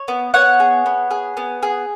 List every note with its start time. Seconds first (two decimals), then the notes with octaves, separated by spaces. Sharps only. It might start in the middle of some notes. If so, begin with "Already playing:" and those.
Already playing: C#5
0.08 B3
0.34 B3 C#5 F#5
0.60 G#4
0.86 B3
1.11 G#4
1.37 B3
1.63 G#4